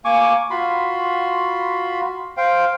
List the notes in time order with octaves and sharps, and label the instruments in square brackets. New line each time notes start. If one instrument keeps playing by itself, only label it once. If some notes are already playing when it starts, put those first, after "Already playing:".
[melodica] A#3 G#5 C#6 D6
F4 F#4 B5 C6
C5 F5 G5